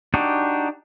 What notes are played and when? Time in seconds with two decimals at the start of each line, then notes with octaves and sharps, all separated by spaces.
0.14 D4 D#4 F#4 G4